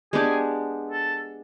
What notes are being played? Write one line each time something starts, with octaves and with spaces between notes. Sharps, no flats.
G#3 B3 D4 G4 G#4
A4